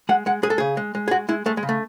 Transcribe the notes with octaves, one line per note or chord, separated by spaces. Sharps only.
G#3 F#5
G#3 F#5
G#3 G#4
A4
C#3 G#4
G#3
G#3
G#4
G#3 F#4
G#3 E4
G#3 A3
G#3
C#3
A3